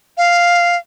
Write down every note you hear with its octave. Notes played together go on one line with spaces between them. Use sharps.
F5